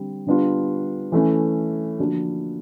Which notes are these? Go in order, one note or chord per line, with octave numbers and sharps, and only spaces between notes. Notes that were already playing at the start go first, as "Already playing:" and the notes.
Already playing: D3 G3 C4
D3 G3 B3 D4 F4
E3 A3 C#4
D3 F3 A#3 D4 F#4